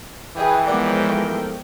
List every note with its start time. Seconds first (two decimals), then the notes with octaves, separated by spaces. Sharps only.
0.37 E3 E4 G#4 B4 D#5 G5
0.67 F3 G#3 B3 A#4 D5 F#5 G5
1.09 A3 A#3 D#4